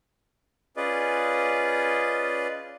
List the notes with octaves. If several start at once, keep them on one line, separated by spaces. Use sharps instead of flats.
C#4 F4 G#4 B4 D5 D#5